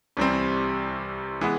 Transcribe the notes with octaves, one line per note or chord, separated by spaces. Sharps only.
C2 C3 E3 G3 C4
E3 G#3 B3